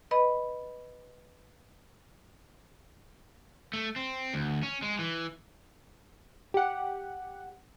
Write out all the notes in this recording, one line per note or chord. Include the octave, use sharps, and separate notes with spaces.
B4 D#5 B5
A3
C4
D2
C#4
G#3
E3
G4 F#5